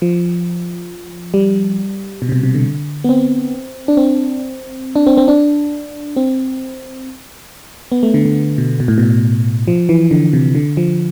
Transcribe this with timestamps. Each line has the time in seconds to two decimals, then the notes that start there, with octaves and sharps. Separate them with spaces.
0.02 F3
1.34 G3
2.22 B2
2.29 C3
2.32 B2
2.43 C3
2.54 D3
3.04 B3
3.09 C4
3.88 D4
3.97 C4
4.96 D4
5.07 C4
5.17 C4
5.28 D4
6.16 C4
7.92 B3
8.03 A3
8.14 D3
8.25 D3
8.58 B2
8.80 B2
8.88 A2
8.98 B2
9.68 F3
9.89 E3
10.11 D3
10.33 C3
10.55 D3
10.77 F3